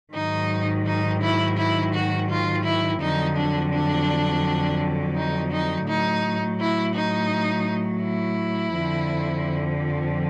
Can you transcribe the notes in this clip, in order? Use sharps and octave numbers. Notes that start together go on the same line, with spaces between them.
G#2 D#3 F#3 D#4
D#4
E4
E4
F#4
F4
E4
F2 D3 F#3 D#4
D4
D4
D#4
D#4
A2 F#3 D#4
E4
D#4
E4
F2 D3 F3